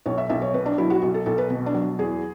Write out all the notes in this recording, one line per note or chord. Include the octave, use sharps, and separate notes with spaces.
B1 C#5
E5
B1 E5
C#5
B2 B4
D4
F#3 E4
F#4
B1
A4
B1 A4
B4
B2
D4
F#3
E2 G#4